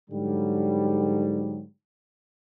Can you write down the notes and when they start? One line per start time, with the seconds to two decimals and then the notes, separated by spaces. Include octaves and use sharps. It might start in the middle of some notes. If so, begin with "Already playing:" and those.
0.10 G#2 D3 F#3 G3